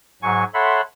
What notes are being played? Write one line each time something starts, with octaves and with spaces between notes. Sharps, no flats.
G#2 F#3 G#5 C#6
A4 C#5 E5 F#5 B5 C6